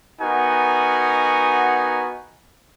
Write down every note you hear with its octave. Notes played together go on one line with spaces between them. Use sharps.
B3 D#4 F#4 A#4 F#5 G#5